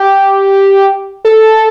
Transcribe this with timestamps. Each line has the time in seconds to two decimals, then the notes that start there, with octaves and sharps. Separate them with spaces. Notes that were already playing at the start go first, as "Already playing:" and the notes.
Already playing: G4
1.25 A4